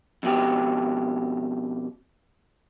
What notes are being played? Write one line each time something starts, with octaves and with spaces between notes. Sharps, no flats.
F2 B2 G4